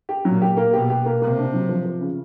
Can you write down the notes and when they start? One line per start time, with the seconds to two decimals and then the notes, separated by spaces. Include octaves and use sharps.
0.09 G4
0.25 A#2 F#3
0.42 G4
0.57 A#3
0.73 B2 G4
0.90 G4
1.05 A#3
1.21 C3 A#3
1.38 D4
1.54 F#3
1.69 F3
1.86 F3
2.01 C#3